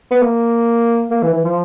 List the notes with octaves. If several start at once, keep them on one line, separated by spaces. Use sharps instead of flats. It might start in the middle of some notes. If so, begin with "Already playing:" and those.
B3
A#3
A#3
E3
E3
F3